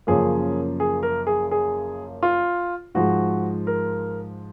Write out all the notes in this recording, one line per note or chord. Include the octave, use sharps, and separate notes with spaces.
F#2 C#3 F3 A#3 G#4
G#4
A#4
G#4
G#4
F4
G#2 F3 G#3 F#4
A#4